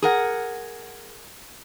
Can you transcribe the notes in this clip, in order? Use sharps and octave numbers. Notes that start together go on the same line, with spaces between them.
G#4 A#4 F#5